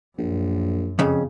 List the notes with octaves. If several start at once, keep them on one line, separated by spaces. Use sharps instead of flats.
A#1 F#2
F2 C#3